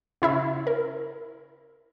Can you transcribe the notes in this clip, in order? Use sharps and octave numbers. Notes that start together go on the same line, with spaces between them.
C#3 E4 E5
A#4